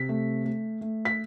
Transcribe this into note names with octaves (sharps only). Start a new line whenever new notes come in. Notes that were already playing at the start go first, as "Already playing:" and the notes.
Already playing: C3 B6
A3
A3
A3
B6